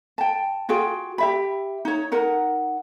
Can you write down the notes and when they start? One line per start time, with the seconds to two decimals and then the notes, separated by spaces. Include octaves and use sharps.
0.18 G5 A5
0.69 F4 F#4 G#4 G5
1.18 G4 E5 B5
1.85 D#4 C#5
2.12 D#4 A#4 F#5 A#5